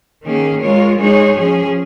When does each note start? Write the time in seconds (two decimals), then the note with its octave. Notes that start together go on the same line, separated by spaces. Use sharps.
0.24 D#3 A#3 C#4 G#4
0.61 G#3 F4 A#4 C#5
0.98 G#3 D#4 G#4 C#5
1.36 F3 C#4 G#4